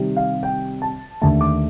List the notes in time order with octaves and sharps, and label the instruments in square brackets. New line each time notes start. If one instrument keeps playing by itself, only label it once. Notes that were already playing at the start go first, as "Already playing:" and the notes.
Already playing: [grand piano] C3 D#3 G3 C4
F5
G5
A5
D#2 D3 A3 A5
D6